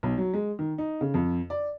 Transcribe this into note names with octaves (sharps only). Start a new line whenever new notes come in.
B1
F#3
G#3
D#3
D#4
C#3
F2
D5